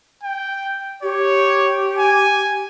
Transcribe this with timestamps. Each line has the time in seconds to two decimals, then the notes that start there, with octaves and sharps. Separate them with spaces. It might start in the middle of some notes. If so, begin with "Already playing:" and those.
0.24 G5
1.03 G4 C#5
1.98 G#5